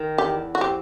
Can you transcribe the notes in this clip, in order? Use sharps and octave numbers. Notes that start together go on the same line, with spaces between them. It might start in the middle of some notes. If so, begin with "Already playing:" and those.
Already playing: D#3
E2 G4
F#4
C4 G4